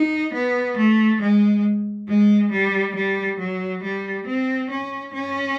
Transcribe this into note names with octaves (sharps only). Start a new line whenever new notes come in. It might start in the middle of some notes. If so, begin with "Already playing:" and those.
Already playing: D#4
B3
A3
G#3
G#3
G3
G3
F#3
G3
C4
C#4
C#4